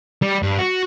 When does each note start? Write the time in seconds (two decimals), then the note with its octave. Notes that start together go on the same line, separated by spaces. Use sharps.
0.22 G3
0.43 G2
0.59 F#4